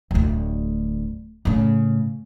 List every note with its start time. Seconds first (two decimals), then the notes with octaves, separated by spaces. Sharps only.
0.11 D1 D2
1.45 A2 C#3